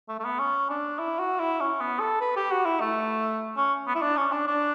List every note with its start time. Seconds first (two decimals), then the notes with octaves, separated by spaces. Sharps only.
0.09 A3
0.19 A3
0.25 B3
0.39 C#4
0.70 D4
0.99 E4
1.19 F#4
1.40 E4
1.60 C#4
1.80 B3
2.00 A4
2.21 B4
2.36 G4
2.51 F#4
2.65 E4
2.81 A3
3.57 C#4
3.87 B3
3.95 E4
4.02 D4
4.17 C#4
4.32 D4
4.47 D4